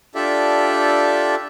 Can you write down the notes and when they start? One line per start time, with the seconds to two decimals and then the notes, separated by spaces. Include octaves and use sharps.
0.15 D4 F4 G4 A4 D5 E5